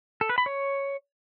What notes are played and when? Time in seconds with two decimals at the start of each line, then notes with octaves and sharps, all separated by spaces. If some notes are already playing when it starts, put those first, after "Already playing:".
0.21 A4
0.29 B4
0.38 B5
0.46 C#5